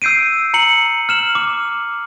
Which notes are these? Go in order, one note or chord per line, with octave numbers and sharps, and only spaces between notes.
E6 G6 C7 D7 D#7
A#5 C#7 F#7
F6 E7 F#7
D6